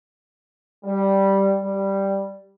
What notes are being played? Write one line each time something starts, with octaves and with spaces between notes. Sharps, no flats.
G3
G3